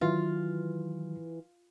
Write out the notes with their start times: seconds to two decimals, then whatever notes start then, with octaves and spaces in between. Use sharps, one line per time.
0.01 D#3 E3 F#3 F4